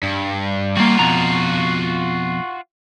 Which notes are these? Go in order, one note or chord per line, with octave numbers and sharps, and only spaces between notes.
G2
G3 A#3 F4 F#4
F2 B2 A#5